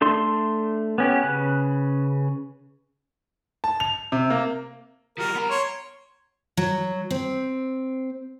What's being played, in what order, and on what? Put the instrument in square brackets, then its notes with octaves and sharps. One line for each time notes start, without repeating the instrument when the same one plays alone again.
[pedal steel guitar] A3 D4 A4 C6
B3 C#4 G4
C#3 B4 F#6
[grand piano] A5
F7
C3
A#3
[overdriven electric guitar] F3 G3 [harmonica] A#4
[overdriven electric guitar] B3 A#5
[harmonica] C#5 C6
[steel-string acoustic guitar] F#3
C4